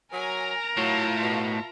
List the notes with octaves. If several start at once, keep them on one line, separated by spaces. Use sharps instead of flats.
F#3 A#4 G#5 A#5
A2 F#3 F4 E5 A5
B2